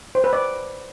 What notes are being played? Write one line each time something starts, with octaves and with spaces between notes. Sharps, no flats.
C5
B4
D5